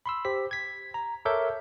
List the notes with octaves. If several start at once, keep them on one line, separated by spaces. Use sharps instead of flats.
B5 C6 E6
G4 C5 B6
G#6 B6
A#5
A4 A#4 C#5 E5 D6 G6